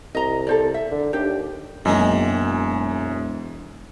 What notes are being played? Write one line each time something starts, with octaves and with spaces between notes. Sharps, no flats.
C2 D#5 A#5
A4 C5 D5
E5
D3
D#2 D4 G4
E1 F#2 D#3 G#3 A#3